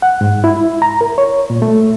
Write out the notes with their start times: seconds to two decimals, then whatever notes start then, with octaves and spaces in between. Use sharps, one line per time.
0.02 F#5
0.21 G#2
0.44 E4
0.82 A#5
1.01 A#4
1.18 C#5
1.50 A#2
1.62 A3